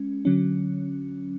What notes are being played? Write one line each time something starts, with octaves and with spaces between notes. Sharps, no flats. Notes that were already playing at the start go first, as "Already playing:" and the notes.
Already playing: G#3 C#4
D3 F#3 C#4